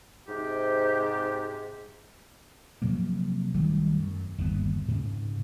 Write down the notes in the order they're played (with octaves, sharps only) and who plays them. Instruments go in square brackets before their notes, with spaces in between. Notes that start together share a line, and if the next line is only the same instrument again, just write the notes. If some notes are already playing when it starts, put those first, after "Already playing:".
[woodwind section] G#2 C3 G4
[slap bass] C3 F3 F#3 A#3
B1 D#3 G3 A3
F#2
G1 D#2 C#3 B3
G#2 C#3